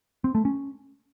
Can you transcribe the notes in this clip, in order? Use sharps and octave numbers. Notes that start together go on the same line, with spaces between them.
C4
A3
C#4